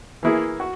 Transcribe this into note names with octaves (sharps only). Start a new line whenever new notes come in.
E3 A#3 E4 G#4
F#4